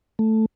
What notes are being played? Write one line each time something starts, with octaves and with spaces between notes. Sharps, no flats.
A3